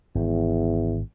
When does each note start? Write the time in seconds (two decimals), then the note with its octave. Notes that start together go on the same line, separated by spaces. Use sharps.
0.15 G#1 E2